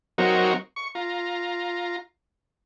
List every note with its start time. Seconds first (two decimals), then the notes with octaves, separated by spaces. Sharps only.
0.18 F#3 C4 D#4 F#4 A#4 C#5
0.76 C#6
0.95 F4 A#5